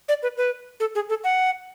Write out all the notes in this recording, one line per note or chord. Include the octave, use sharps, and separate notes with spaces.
D5
B4
B4
A4
G#4
A4
F#5